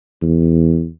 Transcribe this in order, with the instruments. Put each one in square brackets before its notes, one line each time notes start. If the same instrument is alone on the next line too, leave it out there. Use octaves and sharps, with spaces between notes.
[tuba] E2